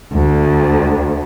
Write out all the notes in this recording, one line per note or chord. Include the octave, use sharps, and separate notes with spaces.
D2